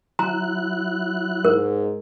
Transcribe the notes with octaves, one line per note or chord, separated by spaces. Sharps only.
F#3 E4 A#5 F#6
G#2 A#4